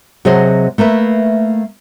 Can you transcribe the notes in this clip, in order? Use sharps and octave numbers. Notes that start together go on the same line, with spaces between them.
C3 F#3 F#4 G#4 C5 D#5
A3 A#3 B4 E5